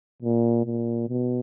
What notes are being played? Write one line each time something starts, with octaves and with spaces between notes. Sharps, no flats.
A#2
A#2
B2